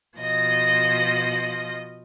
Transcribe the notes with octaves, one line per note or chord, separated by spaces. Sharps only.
B2 F3 D#5 A#6